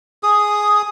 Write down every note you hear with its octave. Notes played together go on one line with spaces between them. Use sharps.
G#4 D#6